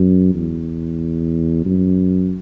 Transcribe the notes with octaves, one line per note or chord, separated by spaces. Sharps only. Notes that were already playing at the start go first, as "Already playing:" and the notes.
Already playing: F#2
E2
F#2